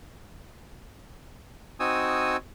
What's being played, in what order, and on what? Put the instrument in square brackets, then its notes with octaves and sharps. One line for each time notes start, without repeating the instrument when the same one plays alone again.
[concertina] C4 D#4 F#4 G#5 D#6 E6